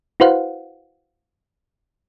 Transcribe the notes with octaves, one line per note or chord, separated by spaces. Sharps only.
E4 F#4 B4 C5 F5 F#5